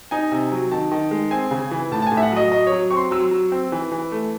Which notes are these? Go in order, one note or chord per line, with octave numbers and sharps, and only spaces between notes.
D#4 G#5
C3
F#3
D#3 A5
D#3
G#3
C4 G#5
C#3
E3
A2 A5
A5
A2 G#5
E5
F#5
F#3 D#5
F#3 D#5
F#3 C#5
C4 C#6
C6
F#3 E6
F#3
C4
E3
E3
A3